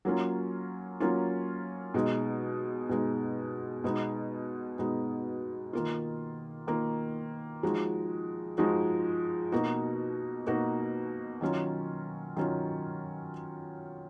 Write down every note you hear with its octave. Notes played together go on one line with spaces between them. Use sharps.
F#3 A#3 C#4 F4
F#3 A#3 C#4 F4
B2 G#3 D#4
B2 G#3 D#4
B2 G#3 B3 D#4
B2 G#3 B3 D#4
D#3 A#3 F4
D#3 A#3 F4
F3 G#3 D#4 F#4
F3 G#3 D#4 F#4
B2 A#3 D#4 F#4
B2 A#3 D#4 F#4
D#3 F#3 C#4 F4
D#3 F#3 C#4 F4